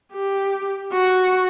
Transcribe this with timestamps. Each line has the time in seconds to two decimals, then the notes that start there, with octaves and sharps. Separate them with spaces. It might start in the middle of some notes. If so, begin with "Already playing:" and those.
0.13 G4
0.92 F#4